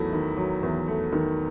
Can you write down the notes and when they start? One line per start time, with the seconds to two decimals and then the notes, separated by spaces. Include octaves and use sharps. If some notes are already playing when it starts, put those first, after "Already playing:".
Already playing: E2 D#3 F#3 A3 E4
0.13 D#3
0.37 F#3
0.63 E2
0.88 A3
1.13 D#3